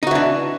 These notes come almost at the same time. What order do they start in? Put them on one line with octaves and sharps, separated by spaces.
D#4 F#4 E3 D4